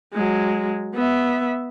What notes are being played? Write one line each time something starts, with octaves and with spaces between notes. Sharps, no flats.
F#3 G#3
B3 E5